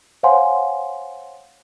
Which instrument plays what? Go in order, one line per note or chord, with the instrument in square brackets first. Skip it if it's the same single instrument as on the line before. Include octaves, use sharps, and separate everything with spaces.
[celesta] C5 C#5 F5 F#5 G#5 C6